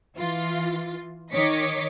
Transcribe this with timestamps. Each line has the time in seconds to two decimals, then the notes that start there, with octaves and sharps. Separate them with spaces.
0.18 E3 F4
1.33 D#3 C#5 D#5 D6 B6 C#7